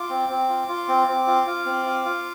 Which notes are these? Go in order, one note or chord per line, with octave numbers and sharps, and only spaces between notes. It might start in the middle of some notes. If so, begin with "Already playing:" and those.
Already playing: F4 D6
C4
C4
F4
F4
C4
C4
F4
F4
C4
F4
F4